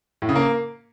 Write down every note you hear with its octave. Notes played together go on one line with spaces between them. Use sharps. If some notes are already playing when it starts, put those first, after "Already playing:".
A2
C#3
A#3